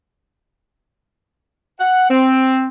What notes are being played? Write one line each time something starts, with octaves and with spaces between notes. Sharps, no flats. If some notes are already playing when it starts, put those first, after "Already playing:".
F#5
C4